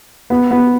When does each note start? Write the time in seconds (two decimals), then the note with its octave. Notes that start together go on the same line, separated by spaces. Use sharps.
0.30 B3
0.51 B3